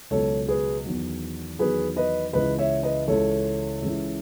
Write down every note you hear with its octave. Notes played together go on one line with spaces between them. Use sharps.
C#2 B2 F#3 A4 C#5
G#4 B4
E2 D#3 F#3
E2 D#3 F#3 G#4 B4
B4 D#5
C#2 C#3 E3 B4 D#5
C#5 E5
B4 D#5
C#2 C#3 E3 A4 C#5
C#2 C#3 E3